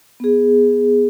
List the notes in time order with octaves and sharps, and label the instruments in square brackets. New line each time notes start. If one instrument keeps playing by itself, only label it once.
[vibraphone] B3 G#4